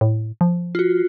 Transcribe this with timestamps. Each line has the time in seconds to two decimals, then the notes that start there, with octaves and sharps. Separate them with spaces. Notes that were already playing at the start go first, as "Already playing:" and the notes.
0.01 A2
0.41 F3
0.75 F4 F#4